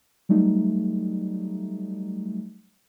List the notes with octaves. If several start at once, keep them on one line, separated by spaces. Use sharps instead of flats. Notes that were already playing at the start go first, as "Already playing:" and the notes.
F#3 G3 A3 D#4